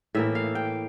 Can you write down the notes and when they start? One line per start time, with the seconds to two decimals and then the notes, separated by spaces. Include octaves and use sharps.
0.15 A2 E3 A#3 E5
0.35 F5
0.55 G5